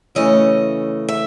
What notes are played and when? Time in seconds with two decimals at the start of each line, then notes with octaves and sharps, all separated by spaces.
0.15 C#3 E3 A3 C#4 D#5
1.08 E5